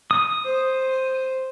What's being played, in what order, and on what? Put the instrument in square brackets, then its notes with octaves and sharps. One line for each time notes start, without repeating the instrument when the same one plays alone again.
[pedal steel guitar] D#6
[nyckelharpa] C5